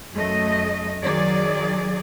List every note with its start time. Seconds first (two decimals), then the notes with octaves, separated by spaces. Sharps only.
0.14 F#2 A3 D#5
1.03 D#3 F#3 G#4 D5